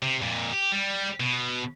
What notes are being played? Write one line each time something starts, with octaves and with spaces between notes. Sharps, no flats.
C3
F2 A#2
G4
G3
B2